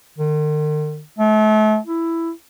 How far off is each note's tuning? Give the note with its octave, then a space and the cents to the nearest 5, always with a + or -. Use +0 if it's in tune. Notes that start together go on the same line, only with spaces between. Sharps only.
D#3 -45
A3 -35
E4 +10